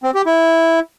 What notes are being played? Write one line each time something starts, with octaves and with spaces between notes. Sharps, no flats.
C4
G4
E4